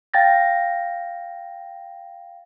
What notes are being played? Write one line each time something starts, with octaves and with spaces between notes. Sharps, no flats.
F5 G5 A6 A#6